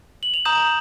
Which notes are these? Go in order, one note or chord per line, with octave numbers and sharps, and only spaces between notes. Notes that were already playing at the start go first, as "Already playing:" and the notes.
F#7
F7
A#5 D#6 G6 E7